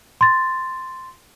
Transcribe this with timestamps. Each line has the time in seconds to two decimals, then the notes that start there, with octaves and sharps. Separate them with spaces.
0.21 C6 A6